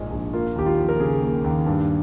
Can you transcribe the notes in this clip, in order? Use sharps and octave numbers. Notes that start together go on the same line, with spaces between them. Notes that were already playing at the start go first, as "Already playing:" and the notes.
Already playing: A#1 G#2 F3 G#3
A#1
A#3 F4
D#2 G4
F4
F3
A#4
C#3 G#4
A#3
D#2
G2